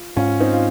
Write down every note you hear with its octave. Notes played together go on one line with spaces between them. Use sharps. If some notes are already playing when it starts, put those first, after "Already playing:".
Already playing: F4
G#2 C#4 F4
C4 D#4
F4